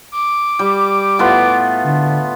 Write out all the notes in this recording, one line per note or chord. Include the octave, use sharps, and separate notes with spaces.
D6
G3
A2 B3 F4
D3